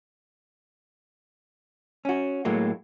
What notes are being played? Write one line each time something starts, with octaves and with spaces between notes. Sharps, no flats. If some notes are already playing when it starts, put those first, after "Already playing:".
C#4 F#4
A2 F#3 G#3 A#3